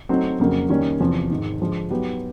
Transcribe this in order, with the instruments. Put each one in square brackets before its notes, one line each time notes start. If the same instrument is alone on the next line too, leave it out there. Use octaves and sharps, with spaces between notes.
[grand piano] F#3 A3 C4 D#4
F2 C#3 F#3 A#3 C#4
D#3 G3 A#3 C#4
E2 C3 F3
G#2 D#3 G#3
D3 F3 G#3
F#3 B3 D#4 G4